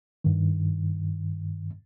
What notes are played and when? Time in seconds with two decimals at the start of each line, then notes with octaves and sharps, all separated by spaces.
0.24 G2 D#3